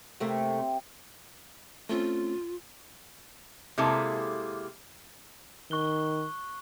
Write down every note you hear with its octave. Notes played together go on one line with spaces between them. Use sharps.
C3 A3 A#3 G4 E5
C4
A3 C4 C#4 F4
C3 G#3 A#3 E4 A4
D#3 C#6 F#6 G7